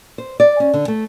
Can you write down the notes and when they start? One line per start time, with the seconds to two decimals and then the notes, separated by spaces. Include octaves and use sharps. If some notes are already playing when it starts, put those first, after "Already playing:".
0.18 C5
0.40 D5
0.60 C#4
0.74 D3
0.88 A3